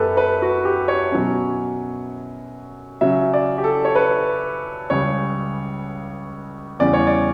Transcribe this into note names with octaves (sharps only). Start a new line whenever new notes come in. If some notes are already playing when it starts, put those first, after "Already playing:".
Already playing: F#2 B3 G4 A4 B4
B4
F#4
G4
C#5
B2 F#3 C#4
C#3 F#3 C#4 E5
D5
G4
A4
C#5
B4
C#2 C#3 G3 C#5
E2 C#3 G3 C#4 D5
C#5
D5